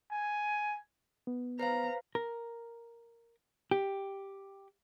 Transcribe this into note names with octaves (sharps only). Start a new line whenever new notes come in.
G#5
B3
B4 C5 F5 A#5
A#4
G4